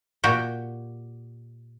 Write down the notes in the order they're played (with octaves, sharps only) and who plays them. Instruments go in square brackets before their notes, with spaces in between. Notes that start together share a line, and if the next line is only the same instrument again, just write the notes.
[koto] A#2 F#4 G4 F#5 G5